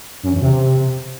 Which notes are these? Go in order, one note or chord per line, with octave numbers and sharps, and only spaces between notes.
F#2
E2
C3